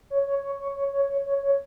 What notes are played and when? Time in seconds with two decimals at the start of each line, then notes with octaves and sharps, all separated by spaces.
0.10 C#5
0.27 C#5
0.43 C#5
0.60 C#5
0.76 C#5
0.93 C#5
1.09 C#5
1.26 C#5
1.43 C#5